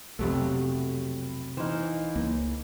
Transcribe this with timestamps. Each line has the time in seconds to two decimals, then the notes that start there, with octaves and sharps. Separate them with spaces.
0.19 B1 F2 C3 F#3 A3 B3 G4 F#5
1.57 E3 D#4 C5 F5
2.16 C#2 A#3